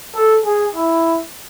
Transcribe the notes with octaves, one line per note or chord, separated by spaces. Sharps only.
A4
G#4
E4